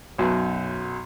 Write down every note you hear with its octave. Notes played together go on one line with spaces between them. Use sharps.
B1 F#2 B2